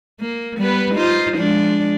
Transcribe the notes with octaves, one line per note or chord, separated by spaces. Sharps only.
A#3
G3 B3 B4
D#4 F4 C5
F3 G#3 D4